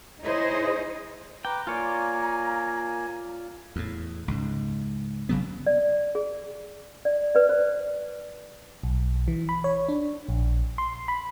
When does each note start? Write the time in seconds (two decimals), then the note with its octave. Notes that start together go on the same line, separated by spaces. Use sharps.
0.21 D#4 E4 G#4 C5 C#5 D#5
1.45 B4 G5 A#5 D6
1.67 A#3 F4 C#5 D5 G#5
3.76 E2 A2
4.28 C#2 G#2
5.29 F#1 C#3 F#3 B3
5.66 D5
6.15 G#4
7.05 D5
7.35 B4 D5
7.49 C5
8.83 B1
9.28 E3
9.49 B5
9.64 C#5
9.89 D4
10.29 A#1
10.78 C6
11.08 B5